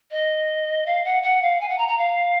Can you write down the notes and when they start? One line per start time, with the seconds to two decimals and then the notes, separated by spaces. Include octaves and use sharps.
0.11 D#5
0.86 F5
1.05 F#5
1.23 F#5
1.42 F5
1.61 G#5
1.69 F#5
1.78 A#5
1.88 A#5
1.98 F5